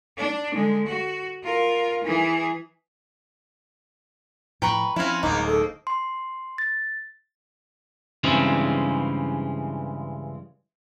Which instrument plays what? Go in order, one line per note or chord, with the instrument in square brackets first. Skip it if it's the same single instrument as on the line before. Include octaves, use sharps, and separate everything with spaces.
[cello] D4
D3 G#3
F#4
F4 A#4
E3 G#4
[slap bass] A2 F3 [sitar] B4 [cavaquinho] G5 A#5 C#6
[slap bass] F3 [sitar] C4 C#4 E4 [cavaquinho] B4 F5
[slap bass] D1 [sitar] G#2 A#3 D#4 [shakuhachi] A#5 [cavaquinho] D6
[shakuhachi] A4
[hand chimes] C6
A6
[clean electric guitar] G2 C#3 E3 G#3 C4 C#4